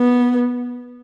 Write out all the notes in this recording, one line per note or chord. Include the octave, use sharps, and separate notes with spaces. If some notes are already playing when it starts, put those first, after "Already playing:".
Already playing: B3